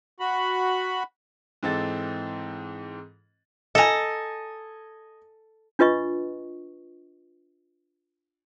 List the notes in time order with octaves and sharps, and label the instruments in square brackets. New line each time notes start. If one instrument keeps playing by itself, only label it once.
[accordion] F#4 B5
[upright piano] G#2 E3 C4 A4 D#5 A6
[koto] A4 A#5 [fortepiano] D#5 G#5
[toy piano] D4 F4 B4 D#5 C#6